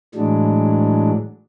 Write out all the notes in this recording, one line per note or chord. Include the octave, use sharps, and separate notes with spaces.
A2 E3 F#3 G#3 D4